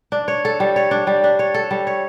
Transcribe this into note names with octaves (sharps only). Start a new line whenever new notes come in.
D4
C#5
A4
G3
C#5
D4
G3
D4
C#5
A4
G3
C#5